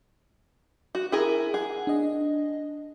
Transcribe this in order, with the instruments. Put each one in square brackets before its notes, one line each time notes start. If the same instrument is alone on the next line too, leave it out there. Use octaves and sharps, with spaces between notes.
[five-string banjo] F#4
E4 G#4 A#4
[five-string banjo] G#4 [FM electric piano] F#5
[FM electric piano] D4 D#5